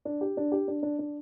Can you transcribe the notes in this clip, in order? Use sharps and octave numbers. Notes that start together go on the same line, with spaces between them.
D4
G4
D4
G4
D4
D4
D4